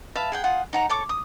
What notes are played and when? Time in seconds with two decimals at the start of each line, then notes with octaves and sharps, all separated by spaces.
0.16 B4 E5 F5 A5
0.32 G#4 F#5 G5
0.44 F4 G#4 F#5
0.73 D#4 F#5 A#5
0.89 A4 C#5 C#6 D6
1.09 D#6